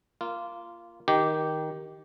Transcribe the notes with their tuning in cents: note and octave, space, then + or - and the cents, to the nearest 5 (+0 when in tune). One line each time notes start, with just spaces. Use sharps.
A#3 +0 F4 -15
D#3 +5 G4 -10